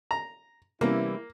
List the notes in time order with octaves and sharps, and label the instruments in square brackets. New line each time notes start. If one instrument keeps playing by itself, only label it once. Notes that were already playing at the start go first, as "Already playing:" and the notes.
[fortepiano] A#5
[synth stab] C3 B3 C#4 [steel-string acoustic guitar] E3 G3 [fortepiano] A#3 [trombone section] E4